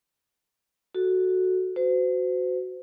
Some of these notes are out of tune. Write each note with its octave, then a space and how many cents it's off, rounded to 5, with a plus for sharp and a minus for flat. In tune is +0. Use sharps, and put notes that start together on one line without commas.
F#4 +0 A4 +0
F#4 +0 C5 -40